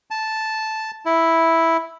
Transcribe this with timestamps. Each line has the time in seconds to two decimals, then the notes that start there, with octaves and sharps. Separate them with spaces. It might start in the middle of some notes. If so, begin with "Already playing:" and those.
0.11 A5
1.06 E4